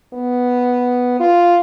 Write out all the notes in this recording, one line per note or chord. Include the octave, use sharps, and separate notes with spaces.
B3
F4